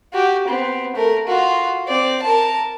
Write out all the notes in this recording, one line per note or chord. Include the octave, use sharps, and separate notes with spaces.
F#4 G4
B3 C4
A3 A#4
F4 F#4
C4 D5
A#4 A5